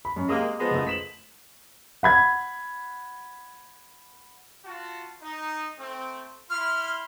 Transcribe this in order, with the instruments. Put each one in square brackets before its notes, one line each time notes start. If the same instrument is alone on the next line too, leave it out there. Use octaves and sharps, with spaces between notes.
[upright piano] B5
F#2
[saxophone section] C3 G#3 A#3 [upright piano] D#5 D#6
[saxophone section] F3 G#3 B3
[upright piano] F#1 A3 D#6
B6 E7 F#7
[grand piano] F#5 B5 G#6
[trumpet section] F4 F#4 A5
D#4
A3 C4
[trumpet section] E4 B5 C6 [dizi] F6